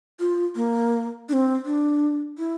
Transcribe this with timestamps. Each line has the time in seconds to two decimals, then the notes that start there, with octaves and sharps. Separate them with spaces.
0.20 F4
0.56 A#3
1.29 D4
1.33 C4
1.65 D4
2.38 E4